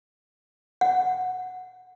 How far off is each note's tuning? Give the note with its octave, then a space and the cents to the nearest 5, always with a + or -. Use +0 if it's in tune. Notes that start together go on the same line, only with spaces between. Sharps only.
F#5 -10